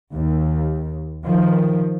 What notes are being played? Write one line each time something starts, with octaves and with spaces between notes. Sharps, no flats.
D#2
D#3 F3